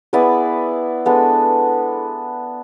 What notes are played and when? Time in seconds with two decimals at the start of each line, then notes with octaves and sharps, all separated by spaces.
0.13 B3 E4 G#4 D5
1.05 G#3 B3 D4 A4